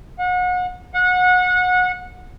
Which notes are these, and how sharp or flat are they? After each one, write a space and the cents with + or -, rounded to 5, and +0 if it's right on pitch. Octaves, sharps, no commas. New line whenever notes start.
F#5 -35
F#5 -25